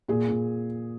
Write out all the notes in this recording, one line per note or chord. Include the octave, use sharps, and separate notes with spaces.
A#2 G#4
A#2